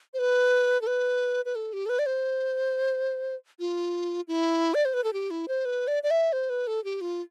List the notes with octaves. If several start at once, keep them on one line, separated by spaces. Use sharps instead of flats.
C5
B4
A4
B4
B4
A4
G4
A4
B4
D5
C5
F4
E4
D5
C5
B4
A4
G4
E4
C5
B4
D5
D5
E5
C5
B4
A4
G4
F4